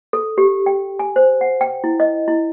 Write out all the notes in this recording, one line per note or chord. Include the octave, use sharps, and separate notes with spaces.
A4
G4
G5
G#5
C5
F#5
G5
E4
D#5
E4